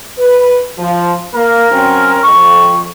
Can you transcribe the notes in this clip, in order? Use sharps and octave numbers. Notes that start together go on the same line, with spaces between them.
B4
F3
A#3 A#4
F#3 C4 C#4
F2 C#6